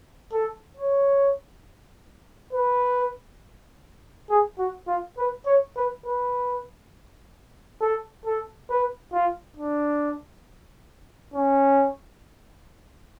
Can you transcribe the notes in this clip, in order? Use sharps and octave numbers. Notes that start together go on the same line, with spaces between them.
A4
C#5
B4
G#4
F#4
F4
B4
C#5
B4
B4
A4
A4
B4
F4
D4
C#4